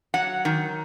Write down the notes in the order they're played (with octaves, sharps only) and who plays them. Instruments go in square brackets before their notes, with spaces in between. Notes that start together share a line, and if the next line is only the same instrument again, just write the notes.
[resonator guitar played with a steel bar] F#3 F#5
D#3